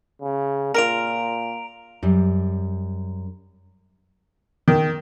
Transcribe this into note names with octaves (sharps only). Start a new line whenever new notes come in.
C#3
A#2 F4 A#4 A#5 D7 F7
F#2 G3
D#3